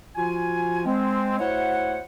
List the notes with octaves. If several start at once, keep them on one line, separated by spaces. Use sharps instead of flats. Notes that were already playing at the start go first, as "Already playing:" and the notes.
F3 F4 F#4 G#5
G#3 C4
D2 E4 C5 C#5 F#5